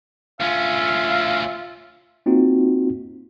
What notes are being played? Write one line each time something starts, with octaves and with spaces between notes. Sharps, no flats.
D2 C#4 F4 E5 F5
A#3 C4 D#4 F4 F#4